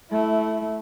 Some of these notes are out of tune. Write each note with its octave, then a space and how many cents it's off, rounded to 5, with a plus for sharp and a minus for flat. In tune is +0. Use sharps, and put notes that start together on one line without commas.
A3 -15 E4 +0